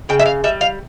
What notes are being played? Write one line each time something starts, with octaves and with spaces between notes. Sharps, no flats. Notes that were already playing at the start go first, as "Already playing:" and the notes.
C#3 G5
E5
F5
G3 E5
F5